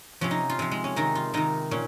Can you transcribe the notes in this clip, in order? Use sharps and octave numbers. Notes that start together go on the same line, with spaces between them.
C3 F3 C#4
D#4
F4
C3 F3
G#3
C#4
C3 D#3 D#4
F4
C3 D#3 D#4
A#2 C#4